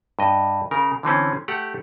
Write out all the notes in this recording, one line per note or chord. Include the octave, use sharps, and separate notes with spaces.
G2 D#5
C#3 A#4
D3 E3 C4 C#4
A3 G4 F#5